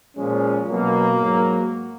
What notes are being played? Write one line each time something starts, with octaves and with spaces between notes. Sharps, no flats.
A#2 F3 G#3 C#4
B2 F#3 A#3
G#2 F#3